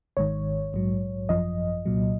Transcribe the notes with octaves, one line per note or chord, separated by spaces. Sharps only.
G#1 G#2 D#3 C#5
A#1 G#2 F#3
G#1 F#2 F3 D#5
C2 A#2 F#3